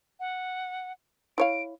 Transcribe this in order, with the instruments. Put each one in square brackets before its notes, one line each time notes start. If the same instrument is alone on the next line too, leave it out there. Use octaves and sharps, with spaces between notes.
[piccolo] F#5
[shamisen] E4 C#5 F5 [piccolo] D7